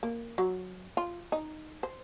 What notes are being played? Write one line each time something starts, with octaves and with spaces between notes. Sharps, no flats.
A#3
F#3
F4
D#4
C5